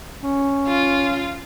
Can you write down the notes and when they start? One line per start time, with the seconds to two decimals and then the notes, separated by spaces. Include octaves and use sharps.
0.22 C#4
0.67 F4